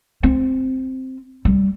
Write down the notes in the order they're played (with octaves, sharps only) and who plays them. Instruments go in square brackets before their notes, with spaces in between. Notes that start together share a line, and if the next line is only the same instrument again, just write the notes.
[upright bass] C4
G3